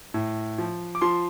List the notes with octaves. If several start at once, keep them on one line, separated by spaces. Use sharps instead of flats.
A2
F3
D6
F3 C6